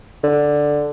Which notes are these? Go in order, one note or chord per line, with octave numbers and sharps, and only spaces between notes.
D3